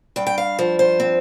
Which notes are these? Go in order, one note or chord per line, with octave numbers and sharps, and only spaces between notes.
G2 G5
G5
F5
F3 C5
C5
C4